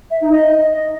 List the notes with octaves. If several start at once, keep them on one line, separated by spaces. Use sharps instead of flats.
E5
D#4
D#5